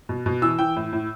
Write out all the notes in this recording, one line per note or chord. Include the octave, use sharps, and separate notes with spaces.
B2
B2
E3 E6
E3 G5
A2
A2